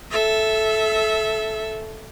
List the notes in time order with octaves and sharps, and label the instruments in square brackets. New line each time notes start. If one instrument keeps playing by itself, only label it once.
[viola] A4 E5